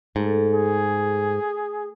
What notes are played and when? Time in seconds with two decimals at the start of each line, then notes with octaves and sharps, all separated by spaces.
0.16 G#2 A3 A4
0.54 G#4